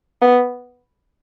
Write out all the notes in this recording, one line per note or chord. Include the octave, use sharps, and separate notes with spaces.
B3